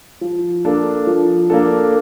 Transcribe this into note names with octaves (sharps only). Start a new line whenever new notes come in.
F3
A#3 D4 A4
F3
A#3 D4 A4